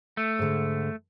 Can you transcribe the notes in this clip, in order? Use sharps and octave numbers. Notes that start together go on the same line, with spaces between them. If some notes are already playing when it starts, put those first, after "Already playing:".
A3
G#2 D3